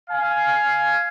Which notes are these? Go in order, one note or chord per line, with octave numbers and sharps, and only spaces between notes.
F5 G#5